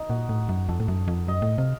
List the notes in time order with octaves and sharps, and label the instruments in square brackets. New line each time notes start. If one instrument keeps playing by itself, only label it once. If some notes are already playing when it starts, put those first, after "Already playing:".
Already playing: [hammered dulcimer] D#4
[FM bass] A#2 [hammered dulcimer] F#4
[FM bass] A2
F#2
[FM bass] F2 [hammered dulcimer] A4
[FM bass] A2
F#2
F2
[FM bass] F#2 [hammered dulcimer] D#5
[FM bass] A2
[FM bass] C3 [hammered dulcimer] F5